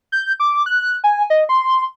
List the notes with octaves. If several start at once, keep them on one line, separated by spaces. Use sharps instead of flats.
G6
D6
F#6
G#5
D#5
C6